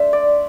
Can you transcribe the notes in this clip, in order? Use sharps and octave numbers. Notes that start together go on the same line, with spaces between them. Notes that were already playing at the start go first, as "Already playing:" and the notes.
Already playing: A3 D4 C5 E5
D5